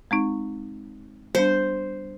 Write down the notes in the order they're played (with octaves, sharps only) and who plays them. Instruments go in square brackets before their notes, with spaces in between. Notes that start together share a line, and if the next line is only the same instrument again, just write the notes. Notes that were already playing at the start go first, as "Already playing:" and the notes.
[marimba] G#3 C4 D#4
[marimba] G3 B3 D4 [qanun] C5